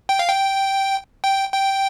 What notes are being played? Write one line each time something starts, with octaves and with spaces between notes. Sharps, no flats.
G5
F5
G5
G5
G5